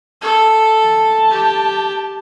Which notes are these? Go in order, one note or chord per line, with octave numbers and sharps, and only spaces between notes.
A4
A5
G4